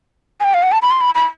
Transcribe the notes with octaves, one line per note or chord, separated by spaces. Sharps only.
G#5
G5
F5
F#5
A5
B5
C6
B5
B5